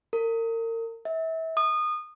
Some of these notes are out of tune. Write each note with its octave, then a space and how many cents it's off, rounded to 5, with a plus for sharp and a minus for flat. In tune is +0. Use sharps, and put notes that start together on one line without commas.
A#4 -35
E5 -30
D#6 -25